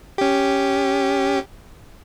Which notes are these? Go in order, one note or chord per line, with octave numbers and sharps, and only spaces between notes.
C#4 G4